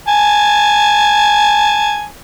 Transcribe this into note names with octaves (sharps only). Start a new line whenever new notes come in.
G#5 A5